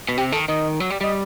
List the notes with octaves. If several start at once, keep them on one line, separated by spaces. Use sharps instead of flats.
B2
C3 G4
D#3 A4
D#3 D#5
F#3
G3
G3 D#5